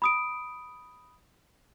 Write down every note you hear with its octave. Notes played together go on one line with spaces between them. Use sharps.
B5 D#6 D7